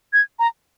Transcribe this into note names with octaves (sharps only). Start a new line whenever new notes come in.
G#6
A#5